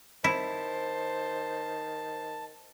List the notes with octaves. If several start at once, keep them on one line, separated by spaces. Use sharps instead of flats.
D#3 E4 C5 A5